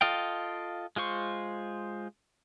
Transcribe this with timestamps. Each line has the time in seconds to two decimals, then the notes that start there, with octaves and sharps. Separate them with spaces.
0.01 F4 A4 D#5 F5 G5
0.96 G#3 F4 C5 C#6